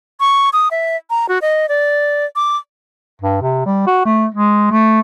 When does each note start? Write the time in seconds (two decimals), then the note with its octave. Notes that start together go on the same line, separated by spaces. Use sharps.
0.20 C#6
0.53 D#6
0.71 E5
1.10 A#5
1.29 F#4
1.42 D#5
1.69 D5
2.36 D6
3.21 G2
3.41 C3
3.66 G3
3.86 F#4
4.05 A3
4.34 G#3
4.71 A3